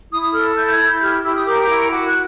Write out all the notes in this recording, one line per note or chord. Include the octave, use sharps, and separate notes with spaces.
E4 D#6
D#6
A4 F6
E4 G6
G#6
E4
G6
G4 F6
F6
G4 E6
D#6
A#4 D6
D6
E4
C#6
F#4 D6
F#6